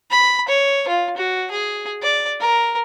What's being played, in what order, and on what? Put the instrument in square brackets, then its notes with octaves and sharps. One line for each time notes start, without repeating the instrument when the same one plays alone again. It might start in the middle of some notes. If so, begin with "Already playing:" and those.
[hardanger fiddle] B5
C#5
F4
F#4
G#4
D5
A#4